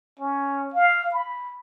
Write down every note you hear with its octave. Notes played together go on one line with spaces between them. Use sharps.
C#4
F5
B5